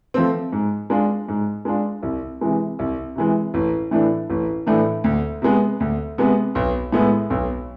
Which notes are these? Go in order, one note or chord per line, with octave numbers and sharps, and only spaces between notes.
F3 A3 C4
G#2
G#3 D4 F4
G#2
G#3 D4 F4
C2
C3 E3 G#3
C2
C3 E3 G#3
A1
A2 E3 A3 D4
A1
A2 E3 A3 D4
D2
C3 G#3 B3
D2
C3 G#3 B3
B1
A2 G#3 B3 E4
B1